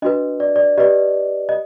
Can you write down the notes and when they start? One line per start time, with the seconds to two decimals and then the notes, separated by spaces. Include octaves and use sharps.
0.02 D4 F#4 B4 D#5
0.40 D5
0.56 D5
0.78 G4 B4 D5 D#5
1.49 D#5